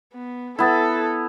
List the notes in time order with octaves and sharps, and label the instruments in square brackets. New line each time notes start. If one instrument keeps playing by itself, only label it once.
[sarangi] B3
[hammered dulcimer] B3 E4 [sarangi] A4 [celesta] B5 D#6 A6